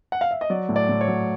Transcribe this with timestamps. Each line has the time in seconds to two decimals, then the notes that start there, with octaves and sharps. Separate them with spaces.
0.12 F#5
0.21 F5
0.31 E5
0.41 D#5
0.50 F#3 D5
0.69 A2
0.76 D5
0.89 A2
1.01 C#5
1.08 F#3